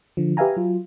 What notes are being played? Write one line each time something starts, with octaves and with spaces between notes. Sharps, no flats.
D3 F3
G4 B4 E5 F5 G#5 A#5
F#3 F4